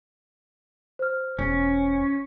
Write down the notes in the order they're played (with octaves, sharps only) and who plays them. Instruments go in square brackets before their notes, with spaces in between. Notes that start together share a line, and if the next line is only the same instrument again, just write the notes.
[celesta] C5 F6
[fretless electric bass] E1 [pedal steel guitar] C#4